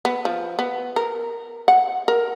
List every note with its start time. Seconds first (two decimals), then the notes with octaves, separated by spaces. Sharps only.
0.05 B3
0.25 F3
0.59 B3
0.96 A#4
1.68 F#5
2.08 A#4